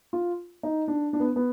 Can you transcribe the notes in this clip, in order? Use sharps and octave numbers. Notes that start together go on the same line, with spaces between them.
F4
D#4
D4
D4
B3
B3